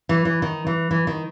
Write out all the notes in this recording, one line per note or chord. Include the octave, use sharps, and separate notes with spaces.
E3
E3
D#3
E3
E3
D#3